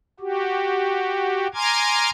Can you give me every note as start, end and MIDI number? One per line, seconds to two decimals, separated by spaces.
0.20 1.47 66
0.20 1.47 67
1.54 2.10 80
1.54 2.10 82
1.54 2.10 84
1.54 2.10 86
1.54 2.10 89
1.54 2.10 92